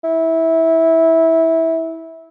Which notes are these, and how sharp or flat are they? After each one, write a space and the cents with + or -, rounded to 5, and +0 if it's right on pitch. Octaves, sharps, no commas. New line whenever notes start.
E4 -15